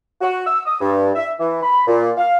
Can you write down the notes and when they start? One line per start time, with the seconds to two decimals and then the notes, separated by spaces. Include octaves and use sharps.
0.22 F#4
0.47 E6
0.65 D#6
0.81 G2
1.15 E5
1.39 E3
1.63 B5
1.87 A#2
2.18 F5